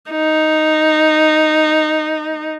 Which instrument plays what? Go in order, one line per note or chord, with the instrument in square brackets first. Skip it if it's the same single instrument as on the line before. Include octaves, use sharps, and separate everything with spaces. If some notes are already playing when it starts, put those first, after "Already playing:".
[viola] D#4